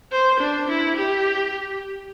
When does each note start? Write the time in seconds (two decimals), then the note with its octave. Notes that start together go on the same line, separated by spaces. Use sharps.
0.12 C5
0.40 D4
0.68 E4
0.96 G4